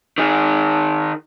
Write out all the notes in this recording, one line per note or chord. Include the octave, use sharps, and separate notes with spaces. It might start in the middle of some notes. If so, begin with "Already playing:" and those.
D#3 G#4